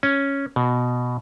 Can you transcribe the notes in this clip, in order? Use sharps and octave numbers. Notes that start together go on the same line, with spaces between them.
C#4
B2